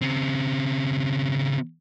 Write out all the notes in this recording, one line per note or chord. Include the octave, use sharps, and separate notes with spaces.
C#3 C4